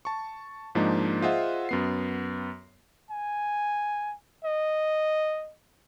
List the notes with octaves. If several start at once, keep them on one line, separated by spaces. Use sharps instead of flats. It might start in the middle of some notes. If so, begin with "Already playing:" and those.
A5 C#6
G#2 F3 G#3 A#3 D4 D#4
F4 G#4 C5 D#5 E5 F#5
F#2 B3 C7
G#5
D#5